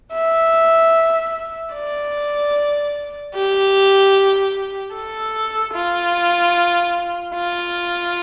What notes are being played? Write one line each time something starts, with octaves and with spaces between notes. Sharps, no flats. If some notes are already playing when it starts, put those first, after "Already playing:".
E5
D5
G4
A4
F4
F4